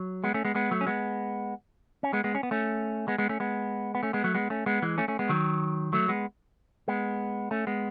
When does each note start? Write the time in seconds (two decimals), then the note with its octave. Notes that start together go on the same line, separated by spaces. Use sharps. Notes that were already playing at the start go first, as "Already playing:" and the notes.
Already playing: F#3
0.24 G#3 B3
0.34 A3 C#4
0.45 G#3 B3
0.55 G#3 B3
0.71 F#3 A3
0.81 C#4
0.87 G#3 B3
2.03 C#4
2.13 G#3 B3
2.24 G#3 B3
2.35 C#4
2.43 B3
2.51 A3 C#4
3.08 G#3 B3
3.18 G#3 B3
3.29 A3 C#4
3.40 G#3 B3
3.95 B3
4.03 A3 C#4
4.13 G#3 B3
4.24 F#3 A3
4.35 G#3 B3
4.50 A3 C#4
4.66 G#3 B3
4.82 E3 G#3
4.98 A3 C#4
5.08 A3 C#4
5.19 G#3 B3
5.29 D#3 F#3
5.93 F#3 A3
6.08 G#3 B3
6.88 G#3 B3
7.51 A3 C#4
7.67 G#3 B3